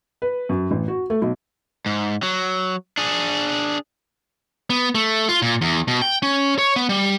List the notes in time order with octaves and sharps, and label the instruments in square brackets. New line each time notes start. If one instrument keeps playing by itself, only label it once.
[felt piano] B4
F#2
A1
F#4
A3
B1
[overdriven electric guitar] G#2
F#3
D4 G#4
[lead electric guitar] B3
A3
F4
A#2
E2
B2
G5
C#4
C#5
B3
G3